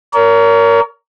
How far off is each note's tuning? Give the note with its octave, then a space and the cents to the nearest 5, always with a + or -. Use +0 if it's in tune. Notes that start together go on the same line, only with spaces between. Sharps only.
A#4 +0 C#5 +40